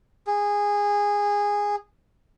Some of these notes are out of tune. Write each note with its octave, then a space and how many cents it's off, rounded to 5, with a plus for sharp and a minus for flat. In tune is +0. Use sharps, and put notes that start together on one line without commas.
G#4 -15